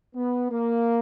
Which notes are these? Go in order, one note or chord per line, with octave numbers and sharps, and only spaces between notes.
B3
A#3